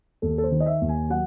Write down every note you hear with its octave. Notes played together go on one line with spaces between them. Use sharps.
D#2 A4
A4
C5
D#3
D#5
E5
D#2
G#5
F#3 F#5